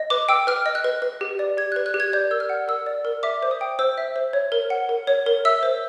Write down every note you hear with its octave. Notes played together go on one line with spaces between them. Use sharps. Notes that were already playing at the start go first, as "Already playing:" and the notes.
Already playing: D#5
B4 D6
G5 E6
B4 F6
D#5
F#6
B4
B4
G4
D5
G4 G#6
B4 F#6
F#6
G4
G#6
D5 G6
A#4 E6
F6
F#5
A#4 E6
D5
A#4
E5 D6
C5
D#6
G5
C5 E6
E5
C5
C#5
A#4
F#5
A#4
C#5
A#4
E5 E6
C5